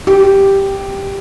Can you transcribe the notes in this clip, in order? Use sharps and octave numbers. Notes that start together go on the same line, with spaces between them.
G4